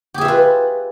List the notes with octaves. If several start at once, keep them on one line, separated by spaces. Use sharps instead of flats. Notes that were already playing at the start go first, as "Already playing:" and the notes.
F4 G4 G#4 B4 E5